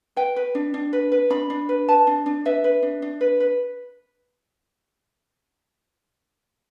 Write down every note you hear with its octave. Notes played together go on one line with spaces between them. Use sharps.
B4 G5
B4
D4
D4
B4
B4
D4 B5
D4
B4
B4 A5
D4
D4
B4 E5
B4
D4
D4
B4
B4